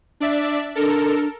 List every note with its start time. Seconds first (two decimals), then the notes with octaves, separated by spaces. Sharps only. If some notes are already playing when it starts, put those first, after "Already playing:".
0.20 D4 D5 E5
0.75 D4 A4 A#4